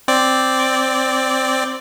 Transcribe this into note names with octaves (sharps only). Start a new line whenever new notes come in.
C4 D5